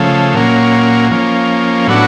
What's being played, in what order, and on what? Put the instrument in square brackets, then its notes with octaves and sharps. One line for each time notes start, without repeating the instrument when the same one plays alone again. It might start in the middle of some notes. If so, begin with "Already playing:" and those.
Already playing: [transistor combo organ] C#3 F3 A3
A#2 F#3 A#3 C#4
F3 A#3 C#4
A2 F#3 B3 D4 F#4